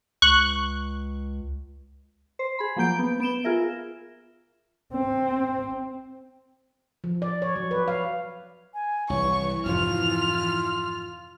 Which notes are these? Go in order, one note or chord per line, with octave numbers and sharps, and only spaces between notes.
C#2 C#6 F#6
C5
G#4 B5
F3 F#3 A#3 G6 D7
B3
B3 D7 E7 G7
F4 G#4 A#4 E5
C4
F3
D5
C#5
F#3
B4
F5
G#5
C2 E3 C#5 C#6
F2 G#2 C3 F4 F6